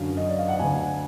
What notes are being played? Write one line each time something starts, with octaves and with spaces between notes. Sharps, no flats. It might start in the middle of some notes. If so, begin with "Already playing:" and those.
Already playing: F#2 D3 F5
D#5
D5
F5
F#5
D2 D3 G#5